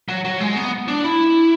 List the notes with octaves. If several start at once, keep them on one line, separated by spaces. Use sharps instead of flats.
F#3
F#3
G#3
B3
D4
E4